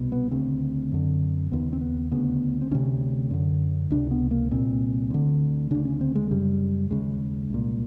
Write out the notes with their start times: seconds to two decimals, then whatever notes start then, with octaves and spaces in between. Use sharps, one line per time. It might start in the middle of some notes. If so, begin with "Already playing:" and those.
Already playing: C2 B2
0.12 B3
0.31 D2 C#3 C4
0.92 F#2 D3
1.51 D#2 C#3 B3
1.73 C4
1.81 B3
2.11 D2 C#3 B3
2.62 C4
2.71 D2 C3 C#4
3.31 F#2 D3
3.91 C#2 C3 D4
4.11 B3
4.31 A#3
4.51 C2 A#2 C4
5.10 D2 D3
5.71 D2 C#3 D4
5.85 C#4
6.01 C4
6.15 G#3
6.31 F#2 C#3 G3
6.91 D#2 C#3 G#3
7.50 C2 A#2